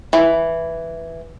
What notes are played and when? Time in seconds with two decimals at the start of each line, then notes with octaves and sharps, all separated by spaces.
0.13 E3